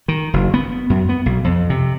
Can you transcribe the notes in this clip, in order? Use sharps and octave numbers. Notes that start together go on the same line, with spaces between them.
D#3
F#1
B3
F#2
B3
B1
F2
C3